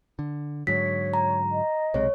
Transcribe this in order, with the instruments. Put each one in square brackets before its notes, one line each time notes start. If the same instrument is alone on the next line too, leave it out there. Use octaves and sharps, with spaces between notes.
[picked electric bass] D3
[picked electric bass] G#2 D3 F#3 [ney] C#5 [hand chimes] B6
[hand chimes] A#5
[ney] D#5
[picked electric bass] B1 C3 G#3 [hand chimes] C#5